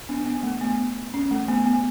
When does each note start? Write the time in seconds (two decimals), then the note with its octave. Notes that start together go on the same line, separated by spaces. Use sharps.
0.09 B3 D4
0.26 B3
0.43 A3
0.61 B3
1.14 C#4
1.31 A3
1.48 B3
1.66 B3